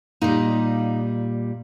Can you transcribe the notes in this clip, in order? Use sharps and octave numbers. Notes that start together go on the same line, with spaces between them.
A#2 G3 D#4 D#5